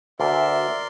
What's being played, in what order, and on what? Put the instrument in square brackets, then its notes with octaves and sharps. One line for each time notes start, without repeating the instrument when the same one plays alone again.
[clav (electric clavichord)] D2 [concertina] A#4 D5 C6 [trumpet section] E5